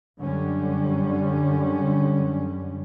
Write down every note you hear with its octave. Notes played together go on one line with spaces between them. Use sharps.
F#2 D3 G3 C#4